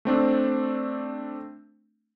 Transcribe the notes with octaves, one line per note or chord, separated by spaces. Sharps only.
A3 C4 D4